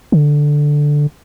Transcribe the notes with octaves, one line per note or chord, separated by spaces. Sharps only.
D3